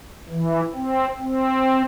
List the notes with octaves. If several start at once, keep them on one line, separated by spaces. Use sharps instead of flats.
E3
C4
C4